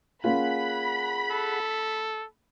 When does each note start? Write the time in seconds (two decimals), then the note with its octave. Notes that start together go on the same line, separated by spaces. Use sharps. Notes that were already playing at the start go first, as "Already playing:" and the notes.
0.24 A#3 C#4 F4 G#4 F#5 B5
1.31 A4